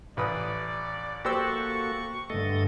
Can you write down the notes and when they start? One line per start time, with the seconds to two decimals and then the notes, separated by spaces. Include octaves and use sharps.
0.17 A1 B4 D5 D#6
1.25 A#3 F#4 G4 A4 C5 C#6 E6
2.30 G2 D3 A3 A4 D#5